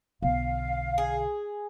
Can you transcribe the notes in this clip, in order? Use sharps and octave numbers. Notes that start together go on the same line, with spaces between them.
B1 D3 F5
G#4